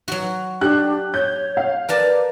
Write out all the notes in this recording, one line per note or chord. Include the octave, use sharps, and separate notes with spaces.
F#3 F#4
D4 G4 F#6
C#5 G6
F5
A#4 B4 D5 A5